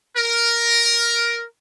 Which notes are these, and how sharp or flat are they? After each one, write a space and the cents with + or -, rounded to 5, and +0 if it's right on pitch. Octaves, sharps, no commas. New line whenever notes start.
A#4 +5